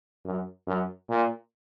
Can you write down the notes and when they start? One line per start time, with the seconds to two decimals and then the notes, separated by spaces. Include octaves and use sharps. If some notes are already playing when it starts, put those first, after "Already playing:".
0.25 F#2
0.67 F#2
1.09 A#2